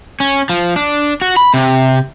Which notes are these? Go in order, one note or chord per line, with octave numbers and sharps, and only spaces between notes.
C#4
F3
D4
F#4
B5
C3